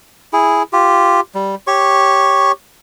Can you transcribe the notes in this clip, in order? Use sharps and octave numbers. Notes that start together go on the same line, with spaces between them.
E4 G#4
F4 G4
G3
G4 C#5 C#6